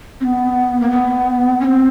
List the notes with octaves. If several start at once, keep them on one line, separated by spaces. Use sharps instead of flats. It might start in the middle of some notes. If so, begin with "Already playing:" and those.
C4
B3
A#3
B3
C#4
C4